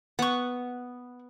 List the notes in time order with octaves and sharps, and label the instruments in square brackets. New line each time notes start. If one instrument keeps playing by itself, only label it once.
[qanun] B3 [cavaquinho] F#5 C#6